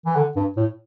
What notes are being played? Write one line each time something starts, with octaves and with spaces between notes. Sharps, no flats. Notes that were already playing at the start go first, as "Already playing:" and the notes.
E3
D3
G2
A2